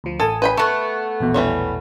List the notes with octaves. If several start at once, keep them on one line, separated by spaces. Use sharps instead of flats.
D2 F3
A1 A4 G#5 D#6
B4 G5 B5
A3 B3 A4 C#6
A#1 E2 B2
E3 G3 C#5